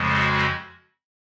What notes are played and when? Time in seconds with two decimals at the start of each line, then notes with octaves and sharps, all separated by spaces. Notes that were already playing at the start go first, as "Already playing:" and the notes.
Already playing: F2 C#3 F3 G#3
0.12 F#4